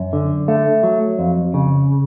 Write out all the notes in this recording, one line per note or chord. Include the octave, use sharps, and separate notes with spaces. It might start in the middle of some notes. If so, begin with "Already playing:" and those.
Already playing: F#2
D3
A3
F#3
F2
C#3